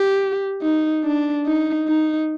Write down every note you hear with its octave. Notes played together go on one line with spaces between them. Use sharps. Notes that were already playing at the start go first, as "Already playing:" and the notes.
Already playing: G4
D#4
D4
D#4
D#4